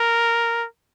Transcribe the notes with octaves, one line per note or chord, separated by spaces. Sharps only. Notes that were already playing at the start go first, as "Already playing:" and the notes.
Already playing: A#4